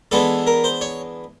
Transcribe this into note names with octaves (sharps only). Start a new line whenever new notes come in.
E3 G#3 B3 D4 A4
A#4
C5
C#5